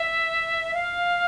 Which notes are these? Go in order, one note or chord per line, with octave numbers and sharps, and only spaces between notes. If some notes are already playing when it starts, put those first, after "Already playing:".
Already playing: E5
F5